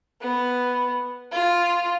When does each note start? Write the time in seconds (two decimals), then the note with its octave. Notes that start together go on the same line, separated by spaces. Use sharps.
0.21 B3
1.32 F4